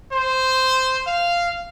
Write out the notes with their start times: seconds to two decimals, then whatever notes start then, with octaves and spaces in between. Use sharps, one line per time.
0.12 C5
1.06 F5